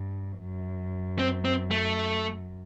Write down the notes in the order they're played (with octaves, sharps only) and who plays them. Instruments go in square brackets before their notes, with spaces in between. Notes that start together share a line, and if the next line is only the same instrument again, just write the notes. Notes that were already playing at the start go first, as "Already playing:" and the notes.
Already playing: [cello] G2
F#2
[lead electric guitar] C4
C4
A3